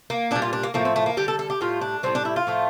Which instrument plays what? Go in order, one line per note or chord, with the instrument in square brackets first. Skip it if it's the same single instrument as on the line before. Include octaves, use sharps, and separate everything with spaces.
[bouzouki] A#3
A#2 G3 D4
F4
D4
A#3
A2 F3 A3 A#3
C4
A3
A#3
D3 G3 G4
A4
A4
G4
A2 G3 F4
D4
A2 G3 C4
D4
E4
F4
A2 F3 A3